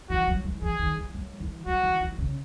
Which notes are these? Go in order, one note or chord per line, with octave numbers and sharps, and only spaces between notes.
E3 F#4
F#3
E3
E3 G#4
D#3
E3
F#3
E3
F#3 F#4
E3
E3
C#3